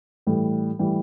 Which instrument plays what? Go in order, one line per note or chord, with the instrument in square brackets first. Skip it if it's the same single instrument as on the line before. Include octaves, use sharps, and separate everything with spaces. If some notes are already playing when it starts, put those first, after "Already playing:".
[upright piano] A2 E3 G3
A2 E3 G3